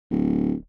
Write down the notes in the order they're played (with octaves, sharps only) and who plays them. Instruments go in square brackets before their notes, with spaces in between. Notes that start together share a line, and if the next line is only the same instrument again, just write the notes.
[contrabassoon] D1